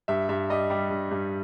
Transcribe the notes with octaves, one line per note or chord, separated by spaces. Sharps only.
G2 E5
G2 E5
G3 D#5
G3
G2
G2